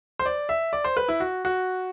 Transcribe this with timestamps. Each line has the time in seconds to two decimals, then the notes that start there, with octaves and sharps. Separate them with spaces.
0.19 C5
0.26 D5
0.49 E5
0.73 D5
0.84 C5
0.97 B4
1.08 E4
1.20 F#4
1.45 F#4